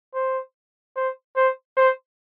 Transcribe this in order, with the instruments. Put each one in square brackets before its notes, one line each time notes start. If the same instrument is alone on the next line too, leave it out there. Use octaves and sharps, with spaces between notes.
[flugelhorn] C5
C5
C5
C5